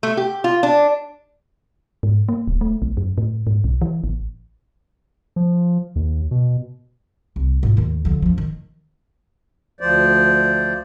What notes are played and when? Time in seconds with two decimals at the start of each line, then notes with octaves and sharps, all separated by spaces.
0.03 A3
0.17 G4
0.44 F4
0.63 D4
2.03 G#2
2.29 A#3
2.48 D1
2.61 A3
2.82 A#1
2.97 F#2
3.18 A2
3.47 G#2
3.64 B1
3.82 E3
4.04 A1
5.36 F3
5.96 D#2
6.31 B2
7.36 C2
7.63 G#2 F4
7.77 D#2 D#3
8.05 D3 F3
8.22 F#2 F3
8.38 D#3
9.81 D2 F3 C5 D5